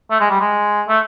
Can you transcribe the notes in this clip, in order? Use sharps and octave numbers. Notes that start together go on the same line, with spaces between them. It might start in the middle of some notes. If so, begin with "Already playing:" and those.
A3
G#3
G3
G#3
A3